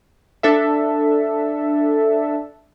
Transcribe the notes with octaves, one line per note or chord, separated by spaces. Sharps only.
D4 A4 E5